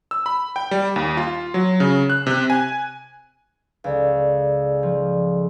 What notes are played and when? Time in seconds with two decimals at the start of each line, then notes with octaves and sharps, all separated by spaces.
0.11 E6
0.26 B5
0.56 G5
0.71 G3
0.96 D#2
1.17 F4
1.54 F#3
1.80 C#3
2.10 F#6
2.27 C3
2.50 G#5
3.84 C#2 A4 D5 F5
4.83 F3